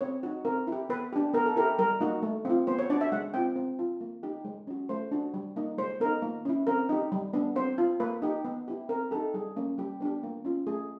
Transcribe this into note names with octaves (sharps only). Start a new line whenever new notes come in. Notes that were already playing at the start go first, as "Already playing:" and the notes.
C4 C#5
D#4 F#4
C4 A#4
E4 G4
B3 B4
D4 G4
B3 A#4
A4
E4 G4 A#4
G3 A#4
A#3 D#4 F#4
A3
C4 F4
B3 C5
C#5
D4 F#4 D5
E5
G#3 F#5
C4 F4 G5
C4
F4
A#3
D#4 G4
G#3
C#4 F#4
A3 C5
D4 F#4
G3
A#3 D#4
G#3 C5
B3 D#4 A#4
A#3
C#4 E4
C4 A#4
D#4 G4
G3
B3 D4
C4 C5
F4
A#3 B4
D#4 G4
B3
E4 G4
C4 A#4
D#4 G4 A4
G3 G#4
A#3 C#4
G3 G4
B3 D4 G4
A#3
C#4 F4
A3 G#4